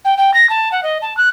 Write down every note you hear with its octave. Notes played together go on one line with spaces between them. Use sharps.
G5
G5
A#6
A5
F#5
D#5
A5
F#6